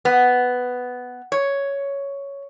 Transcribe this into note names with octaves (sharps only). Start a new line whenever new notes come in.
B3
C#5